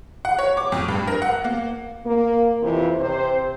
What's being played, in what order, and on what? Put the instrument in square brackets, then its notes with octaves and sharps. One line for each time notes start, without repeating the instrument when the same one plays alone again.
[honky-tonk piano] F#5
C#5
D6
F2
G2
A#4
F#5
A#3
[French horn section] A#3
F2 C3 E3
C3 C5